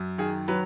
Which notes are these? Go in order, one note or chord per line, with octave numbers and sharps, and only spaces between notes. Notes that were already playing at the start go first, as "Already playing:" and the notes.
Already playing: F#2
D#3 G#4
F#3 B4